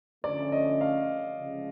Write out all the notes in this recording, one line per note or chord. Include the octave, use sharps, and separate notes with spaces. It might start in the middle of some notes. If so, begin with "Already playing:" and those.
D3 F3 A3 C#4 D5
D#5
F5
C#3 F3 G#3